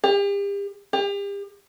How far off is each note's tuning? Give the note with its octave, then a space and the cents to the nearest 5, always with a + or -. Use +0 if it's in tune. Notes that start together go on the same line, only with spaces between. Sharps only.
G4 +40
G4 +40